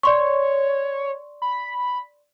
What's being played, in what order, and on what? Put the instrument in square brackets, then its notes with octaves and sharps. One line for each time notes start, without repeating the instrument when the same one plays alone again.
[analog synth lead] C#5 [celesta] D5 C6 C#6
[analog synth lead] B5